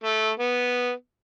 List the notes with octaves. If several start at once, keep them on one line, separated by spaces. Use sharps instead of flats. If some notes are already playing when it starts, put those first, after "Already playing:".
A3
B3